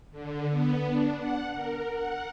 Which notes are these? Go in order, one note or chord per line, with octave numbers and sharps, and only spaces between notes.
D3
B3
D4
F#5
A#4
F#5